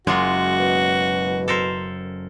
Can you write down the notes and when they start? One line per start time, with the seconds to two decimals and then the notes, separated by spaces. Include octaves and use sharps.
0.07 F#1 F#2 G#3 A#3 F4 F#4
0.60 B2
1.48 A4 A#4 C5